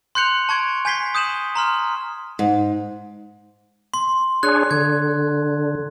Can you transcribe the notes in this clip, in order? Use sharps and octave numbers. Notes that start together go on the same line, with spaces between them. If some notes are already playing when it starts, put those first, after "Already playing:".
C6 F#6 G6 C#7 F7
A5 C#6 G#6 D7
G#5 G6 G#6 B6 C7 G7
D#6 G6 D#7 E7 F#7
A#5 C6 F6
G#2
C6
D4 G#4 C#5 F#6
D3 G#6